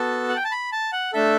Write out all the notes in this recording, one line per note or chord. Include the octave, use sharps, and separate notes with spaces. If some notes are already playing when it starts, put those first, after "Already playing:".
Already playing: B3 F#4 A4 A5
F#5
G5
A5
B5
A5
F#5
A3 D4 A4 E5